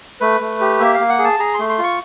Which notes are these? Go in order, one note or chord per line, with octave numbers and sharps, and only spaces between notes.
A3 B4
A3
G4
A#3 E5
F5
A#3
F#5
G#4
A5
G#4 A#5
A3 C6
C6
F4
C#6